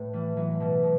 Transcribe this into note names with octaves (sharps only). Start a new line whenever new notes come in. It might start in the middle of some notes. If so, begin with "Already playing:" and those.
Already playing: A2 A3 B3
E3 G3
E3 F#3
B2 G3
B2